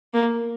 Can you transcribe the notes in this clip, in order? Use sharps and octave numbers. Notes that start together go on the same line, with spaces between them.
A#3